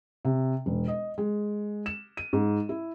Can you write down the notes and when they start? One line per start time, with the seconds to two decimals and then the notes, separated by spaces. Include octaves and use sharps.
0.25 C3
0.66 E1
0.88 D#5
1.18 G#3
1.86 E7
2.17 D#7
2.33 G#2
2.69 E4